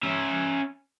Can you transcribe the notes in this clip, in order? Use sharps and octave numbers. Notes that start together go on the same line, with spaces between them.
C#4 E5